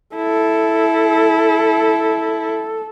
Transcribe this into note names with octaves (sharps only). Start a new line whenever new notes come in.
E4 A4